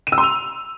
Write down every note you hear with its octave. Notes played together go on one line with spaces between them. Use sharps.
D#7
E6
C6
F7